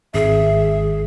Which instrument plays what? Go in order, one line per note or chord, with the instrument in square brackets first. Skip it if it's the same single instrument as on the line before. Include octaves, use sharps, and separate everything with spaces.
[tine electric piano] G#1 [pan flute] G#4 [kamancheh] E5